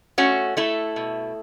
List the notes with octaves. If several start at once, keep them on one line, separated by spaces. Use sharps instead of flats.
A3 C#4 F#4
A3 E4 A4
B2